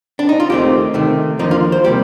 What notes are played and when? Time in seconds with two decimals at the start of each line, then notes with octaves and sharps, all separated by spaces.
0.19 D4
0.29 D#4
0.40 F4
0.50 D#2 D#3 A3 C4 G4
0.94 C3 D#3 A3
1.39 D#2 D3 F3 A#3 D#4
1.51 F4
1.72 C5
1.84 C3 G3 A#3 G4